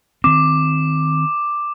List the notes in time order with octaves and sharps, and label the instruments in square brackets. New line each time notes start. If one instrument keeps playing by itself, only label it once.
[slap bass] D#3 C4 [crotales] D6